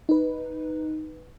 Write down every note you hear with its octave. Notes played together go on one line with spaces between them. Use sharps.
D#4 B4